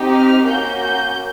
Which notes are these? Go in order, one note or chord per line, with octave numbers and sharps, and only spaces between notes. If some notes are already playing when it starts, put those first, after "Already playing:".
Already playing: C4 D#4 G4
F6
A#3 C#4 F#4 G6
G6